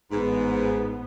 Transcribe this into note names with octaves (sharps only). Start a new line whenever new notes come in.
A1 G#2 B3